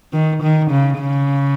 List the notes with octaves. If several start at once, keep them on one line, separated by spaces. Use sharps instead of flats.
D#3
D#3
C#3
C#3